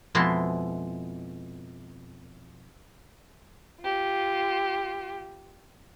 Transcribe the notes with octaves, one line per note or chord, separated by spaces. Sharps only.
F2 B2 G#3 E4 A5 C6
F4 G4